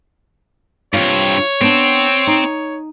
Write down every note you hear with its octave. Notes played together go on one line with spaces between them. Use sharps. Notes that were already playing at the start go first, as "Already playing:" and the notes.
G2 C4 F4 C#5
B3 C4 D4
D#4